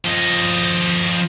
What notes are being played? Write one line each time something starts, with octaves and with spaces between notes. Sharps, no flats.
F3 D#5